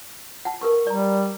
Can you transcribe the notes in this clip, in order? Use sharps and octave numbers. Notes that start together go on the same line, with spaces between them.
F#5 A5
A#4 B4 C#6
G3 D5 A#5